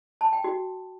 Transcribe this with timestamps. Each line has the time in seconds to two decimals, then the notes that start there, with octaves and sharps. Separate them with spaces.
0.21 A5
0.33 G5
0.44 F#4